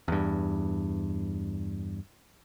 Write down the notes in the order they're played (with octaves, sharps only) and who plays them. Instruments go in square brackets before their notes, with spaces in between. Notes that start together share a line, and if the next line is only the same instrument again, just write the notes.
[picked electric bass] E2 G2